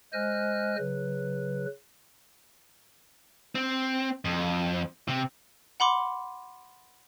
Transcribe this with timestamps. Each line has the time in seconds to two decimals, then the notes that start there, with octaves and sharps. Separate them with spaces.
0.13 G#3 C5 D#5 G#5 F6 F#6
0.78 C#3 F#3 B4
3.55 C4
4.25 F2
5.08 C3
5.80 F#5 B5 C6 D6